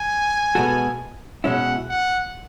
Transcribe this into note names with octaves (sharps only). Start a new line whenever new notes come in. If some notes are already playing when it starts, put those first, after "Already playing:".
Already playing: G#5
B2 G#3 B3 F#4 A4
B2 G#3 C#4 E4 F#5
F#5